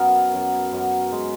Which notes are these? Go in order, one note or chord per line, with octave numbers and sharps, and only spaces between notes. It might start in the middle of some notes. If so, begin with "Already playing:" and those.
Already playing: F#2 B3 A#4
F#2
F#2
G#3